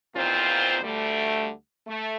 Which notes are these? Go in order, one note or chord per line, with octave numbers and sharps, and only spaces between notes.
E2 A#2 D#3 C4 F4 C5
D2 D3 G3 A3
A3